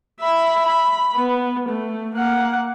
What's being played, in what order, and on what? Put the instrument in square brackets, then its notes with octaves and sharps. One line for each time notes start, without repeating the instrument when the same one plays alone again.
[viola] E5 B5
B5
B3
A3
A#3 F#5